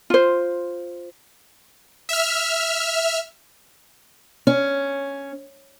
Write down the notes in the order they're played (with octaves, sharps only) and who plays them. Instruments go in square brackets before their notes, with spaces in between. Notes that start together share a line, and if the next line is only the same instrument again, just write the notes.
[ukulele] F4 C5
[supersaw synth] E5 F6
[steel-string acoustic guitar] C#4